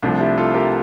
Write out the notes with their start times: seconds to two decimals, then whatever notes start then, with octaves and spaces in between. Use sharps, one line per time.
0.02 C2 C3 F3 A3 D4
0.20 E4 G4
0.37 F4 A4
0.54 G4 A#4